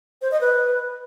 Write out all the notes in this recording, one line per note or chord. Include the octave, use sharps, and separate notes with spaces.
C5
D#5
B4